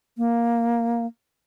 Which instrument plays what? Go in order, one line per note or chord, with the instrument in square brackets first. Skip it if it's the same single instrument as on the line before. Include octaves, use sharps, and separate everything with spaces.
[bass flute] A#3